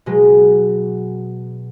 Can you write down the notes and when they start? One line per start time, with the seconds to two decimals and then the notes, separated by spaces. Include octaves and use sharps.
0.06 B2 F#3 G#3